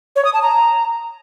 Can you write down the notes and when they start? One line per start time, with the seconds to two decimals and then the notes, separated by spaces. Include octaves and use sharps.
0.16 C#5
0.25 D#6
0.34 A5
0.42 A#5